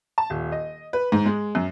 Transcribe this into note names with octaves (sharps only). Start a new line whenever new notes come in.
A5
D#1
D#5
B4
G#2
G#3
F#2